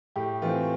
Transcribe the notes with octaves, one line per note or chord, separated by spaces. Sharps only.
A2 G4
E3 A3 C4 F4